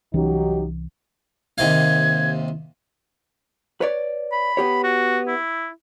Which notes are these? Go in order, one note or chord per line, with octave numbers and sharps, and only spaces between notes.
C2 E3 F#3 C#4 D#4 G4
D#2 C3 F5 G#6
B4 C#5 D5
B5
B3 G4 C#5
F#4
E4